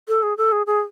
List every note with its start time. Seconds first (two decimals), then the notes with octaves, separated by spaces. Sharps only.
0.08 A4
0.23 G#4
0.37 A4
0.52 G#4
0.67 G#4